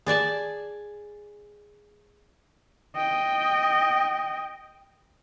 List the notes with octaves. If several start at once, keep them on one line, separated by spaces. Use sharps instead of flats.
G#4 D5 G#5 A5
D#5 G5